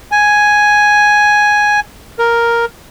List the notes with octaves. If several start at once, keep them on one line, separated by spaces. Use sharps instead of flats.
G#5
A#4